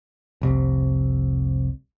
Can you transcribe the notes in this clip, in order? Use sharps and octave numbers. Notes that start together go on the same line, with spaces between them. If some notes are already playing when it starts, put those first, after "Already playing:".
F1 C2 C3